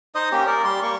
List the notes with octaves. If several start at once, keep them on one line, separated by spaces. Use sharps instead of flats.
D#4 C5 D#5 D#6
A#3 C#4 G4
A#4 D5
G3 C6
A#3 C#6